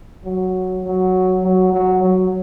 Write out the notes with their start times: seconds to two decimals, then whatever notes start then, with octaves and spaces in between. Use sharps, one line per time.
0.25 F#3
0.84 F#3
1.43 F#3
1.73 F#3
2.02 F#3